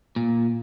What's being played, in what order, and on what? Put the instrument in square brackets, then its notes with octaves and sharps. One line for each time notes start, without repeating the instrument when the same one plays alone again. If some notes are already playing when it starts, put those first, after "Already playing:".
[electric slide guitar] A#2